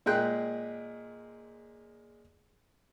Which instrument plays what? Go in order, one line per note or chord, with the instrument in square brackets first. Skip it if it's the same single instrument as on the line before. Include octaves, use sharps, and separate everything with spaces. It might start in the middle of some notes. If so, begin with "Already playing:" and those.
[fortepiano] A#2 G#3 G#4 G5 F#6